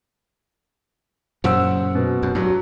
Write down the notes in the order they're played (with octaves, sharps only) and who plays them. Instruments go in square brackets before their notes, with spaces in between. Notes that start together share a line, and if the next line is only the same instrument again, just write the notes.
[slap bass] F#2 A#2 C#3 [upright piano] C5 F#5 E6
[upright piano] B2
[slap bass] F#2
[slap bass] G2 [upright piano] F#3